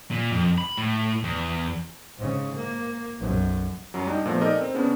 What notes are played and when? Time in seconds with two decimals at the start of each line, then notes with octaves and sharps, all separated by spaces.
0.11 A#2
0.32 F2
0.58 B5
0.77 A2
1.24 E2
2.17 G#2 C#3
2.56 A#3
3.18 B1 F#2
3.94 F#2 F#3
4.07 G3 D4 D#4
4.26 A#2 F3 A3 B3
4.41 D#4 G4 A4 A#4 D5 D#5
4.61 C4
4.74 C#3 B3 C#4 D4